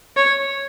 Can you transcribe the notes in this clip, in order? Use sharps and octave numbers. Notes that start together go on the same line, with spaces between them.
C#5